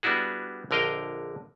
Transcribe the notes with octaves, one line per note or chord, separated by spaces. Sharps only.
G3 B3 D4 E4 F#4 G#4
A#1 D3 A#4 D#5 F5 G5